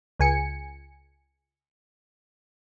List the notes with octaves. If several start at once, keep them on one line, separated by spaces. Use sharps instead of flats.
C#2 G#5 C#7